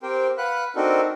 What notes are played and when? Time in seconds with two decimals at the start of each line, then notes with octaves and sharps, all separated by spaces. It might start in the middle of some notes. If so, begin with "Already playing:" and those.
0.03 C4 G4 A#4 C5 G5
0.38 B4 F5 F#5 B5 F#6
0.76 C4 D4 D#4 F#4 A4 A#4